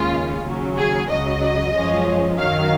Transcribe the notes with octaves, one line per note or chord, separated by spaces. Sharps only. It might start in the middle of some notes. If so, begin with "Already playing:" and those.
Already playing: D#2 C#3 G#3 C#4 F4
D#2 C#3 F#3 C#4
G#4
C#2 C#3 F#3 D#5
F#2 F3 G#3 C#4
F#2 D#3 F#3 F5